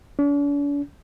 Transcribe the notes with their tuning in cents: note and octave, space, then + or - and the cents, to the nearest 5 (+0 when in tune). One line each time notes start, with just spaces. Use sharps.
D4 -45